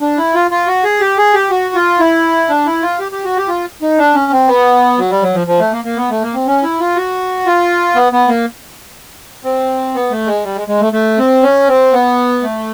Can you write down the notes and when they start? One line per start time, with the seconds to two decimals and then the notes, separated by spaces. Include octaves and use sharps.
0.01 D4
0.18 E4
0.35 F4
0.51 F4
0.67 F#4
0.84 G#4
1.00 G4
1.18 G#4
1.34 G4
1.50 F#4
1.75 F4
2.00 E4
2.49 D4
2.66 E4
2.82 F4
2.99 G4
3.12 G4
3.25 F#4
3.37 G4
3.48 F4
3.82 D#4
3.98 D4
4.14 C#4
4.32 C4
4.47 B3
4.98 F#3
5.11 G3
5.23 F#3
5.34 F3
5.47 F3
5.60 A3
5.73 A#3
5.85 A#3
5.97 B3
6.10 A3
6.22 A#3
6.34 C4
6.47 C#4
6.63 E4
6.80 F4
6.96 F#4
7.46 F4
7.95 B3
8.13 B3
8.28 A#3
9.44 C4
9.95 B3
10.11 A3
10.27 G#3
10.44 G3
10.56 G#3
10.68 G#3
10.81 A3
10.93 A3
11.18 C4
11.42 C#4
11.68 C4
11.93 B3
12.43 A3